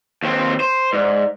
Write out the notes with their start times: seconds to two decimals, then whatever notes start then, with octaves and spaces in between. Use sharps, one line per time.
0.23 D#2 C4
0.60 C5
0.93 G#2 D5